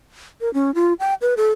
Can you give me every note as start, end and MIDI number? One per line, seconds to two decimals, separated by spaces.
0.41 0.52 70
0.54 0.74 61
0.75 0.93 65
1.00 1.14 79
1.21 1.34 71
1.37 1.52 69